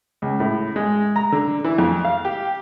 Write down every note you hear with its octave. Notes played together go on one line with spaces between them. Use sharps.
C#2
A2
G#3
A#5
D3
E3
F2
F5
G4